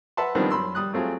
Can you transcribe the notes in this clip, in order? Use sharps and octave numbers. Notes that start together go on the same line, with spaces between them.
B4 E5 F#5 A5 C6
D#3 F3 G3 B3 C4 D4
F#2 B5 C6 E6
G3 D#6 F#6
F#3 A3 C4 F4 G#4